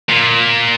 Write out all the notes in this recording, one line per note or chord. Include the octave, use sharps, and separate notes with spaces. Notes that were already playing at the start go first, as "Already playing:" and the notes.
A#2